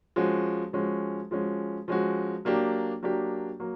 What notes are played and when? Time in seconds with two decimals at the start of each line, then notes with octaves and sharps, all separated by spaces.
0.16 F3 G#3 C#4 F#4
0.73 F3 G#3 C#4 F#4
1.31 F3 G#3 C#4 F#4
1.88 F3 G#3 C#4 F#4
2.45 F#3 A#3 D4 G4
3.03 F#3 A#3 D4 G4
3.60 F#3 A#3